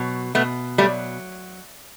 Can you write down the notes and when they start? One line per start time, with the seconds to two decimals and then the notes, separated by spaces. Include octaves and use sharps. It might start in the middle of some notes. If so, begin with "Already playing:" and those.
Already playing: B2 F#3
0.35 B2 A3 B3
0.78 F#3 G3 A3